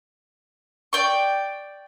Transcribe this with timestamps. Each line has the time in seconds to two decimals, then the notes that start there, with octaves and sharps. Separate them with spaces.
0.93 D5 G5 C#6